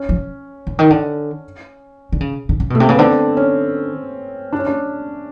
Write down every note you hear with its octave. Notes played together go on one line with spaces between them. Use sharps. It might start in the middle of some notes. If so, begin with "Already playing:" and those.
Already playing: C#4
F3
D3
D#3
D3
D3
C#3
D3
C#3
B2 A3
C3 A#3
C#3 B3
D3 C4
C#4
D4
C#4
D4